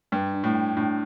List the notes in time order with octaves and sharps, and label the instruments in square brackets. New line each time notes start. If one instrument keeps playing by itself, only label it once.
[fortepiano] G2 [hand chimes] D4
[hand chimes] D4
[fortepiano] A2
[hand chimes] G5
[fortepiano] A2 [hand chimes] D4